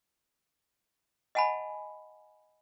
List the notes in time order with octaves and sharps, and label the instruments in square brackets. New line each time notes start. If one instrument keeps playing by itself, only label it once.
[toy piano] D#5 F#5 G#5 A5 B5